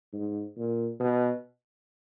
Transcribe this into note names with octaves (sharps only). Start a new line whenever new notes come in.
G#2
A#2
B2